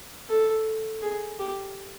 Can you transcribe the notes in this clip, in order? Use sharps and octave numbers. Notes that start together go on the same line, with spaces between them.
A4
G#4
G4